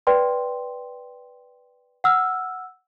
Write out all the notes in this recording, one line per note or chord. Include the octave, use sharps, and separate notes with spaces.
B4 D5 G5 C6
F#5 E6 F6